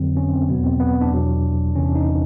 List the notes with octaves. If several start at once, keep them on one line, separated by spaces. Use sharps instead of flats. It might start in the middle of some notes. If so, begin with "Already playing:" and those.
Already playing: F2 D3 F#3 C4
C#4
C4
E2 B2 F#3 B3
C4
B3
D4
E2 B2 F#3
E2 C3 E3 C#4
D4
D#4